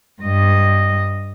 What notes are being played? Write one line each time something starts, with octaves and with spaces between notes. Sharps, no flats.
G2 D#5